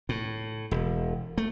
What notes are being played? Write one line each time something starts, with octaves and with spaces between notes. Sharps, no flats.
A2
E1
A3